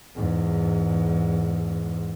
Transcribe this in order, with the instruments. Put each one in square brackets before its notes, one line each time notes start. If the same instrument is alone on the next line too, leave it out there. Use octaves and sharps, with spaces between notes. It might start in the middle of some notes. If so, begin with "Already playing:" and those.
[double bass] E2 G#2